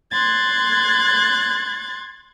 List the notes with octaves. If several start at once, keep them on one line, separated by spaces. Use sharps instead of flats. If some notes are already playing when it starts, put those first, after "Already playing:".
C6 F#6 G#6 A6